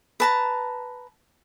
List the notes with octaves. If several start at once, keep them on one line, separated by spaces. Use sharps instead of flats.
B4 A5 A#5